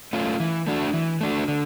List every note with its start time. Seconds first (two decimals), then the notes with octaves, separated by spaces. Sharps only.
0.13 A3 C#4 F4
0.40 E3
0.67 A3 D4 F#4
0.93 E3
1.21 A3 D4 F#4
1.48 D3